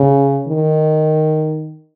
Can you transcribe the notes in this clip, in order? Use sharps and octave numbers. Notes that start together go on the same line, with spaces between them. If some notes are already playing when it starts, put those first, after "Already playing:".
Already playing: C#3
D#3